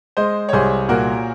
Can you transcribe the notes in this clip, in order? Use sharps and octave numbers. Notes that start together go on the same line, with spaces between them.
G#3 C5 D#5
C#5
C2 G#4 C5
A#2 F#4 A#4